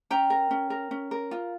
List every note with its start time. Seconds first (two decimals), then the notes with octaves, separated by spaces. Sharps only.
0.10 C#4 G5 A#5
0.30 A#4
0.51 C#4
0.70 A#4
0.91 C#4
1.11 A#4
1.31 F4